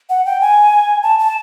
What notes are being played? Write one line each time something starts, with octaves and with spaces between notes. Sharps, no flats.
F#5
G5
G#5
A5
A5